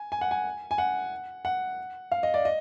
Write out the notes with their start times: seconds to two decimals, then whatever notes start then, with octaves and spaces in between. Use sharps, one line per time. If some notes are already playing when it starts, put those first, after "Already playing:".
Already playing: G#5
0.12 G#5
0.21 F#5
0.31 G#5
0.71 G#5
0.78 F#5
1.45 F#5
2.12 F5
2.23 D#5
2.34 D5
2.45 D#5